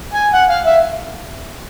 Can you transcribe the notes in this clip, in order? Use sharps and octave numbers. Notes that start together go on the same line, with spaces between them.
G#5
F#5
F5
E5